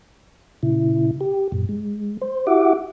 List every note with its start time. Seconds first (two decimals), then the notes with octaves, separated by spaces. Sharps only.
0.63 A#2 C#3 E4
1.21 G4
1.52 F#2 A#2
1.69 G#3
2.21 C5
2.47 E4 F#4 G4 E5 F#5 D6